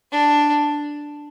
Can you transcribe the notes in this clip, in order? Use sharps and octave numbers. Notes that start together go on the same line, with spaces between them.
D4